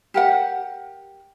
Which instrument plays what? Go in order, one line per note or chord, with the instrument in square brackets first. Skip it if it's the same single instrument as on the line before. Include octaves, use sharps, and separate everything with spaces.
[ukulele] G4 A#4 F#5